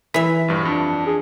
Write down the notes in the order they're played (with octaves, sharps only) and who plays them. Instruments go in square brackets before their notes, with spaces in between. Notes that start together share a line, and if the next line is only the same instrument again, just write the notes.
[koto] E3 E5 [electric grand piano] B6
[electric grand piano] A#1 G2
[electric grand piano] F2 [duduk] D4
[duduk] G#4